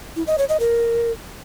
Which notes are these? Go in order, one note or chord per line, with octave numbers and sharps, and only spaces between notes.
E4
D#5
C#5
D#5
A#4